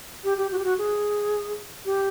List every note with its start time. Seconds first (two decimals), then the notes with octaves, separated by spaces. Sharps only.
0.24 G4
0.38 G4
0.52 F#4
0.59 G4
0.64 F#4
0.78 G#4
1.86 G4